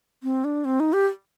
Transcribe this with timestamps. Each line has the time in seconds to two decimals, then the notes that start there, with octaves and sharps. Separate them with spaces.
0.23 C4
0.44 D4
0.65 C4
0.80 D#4
0.93 G4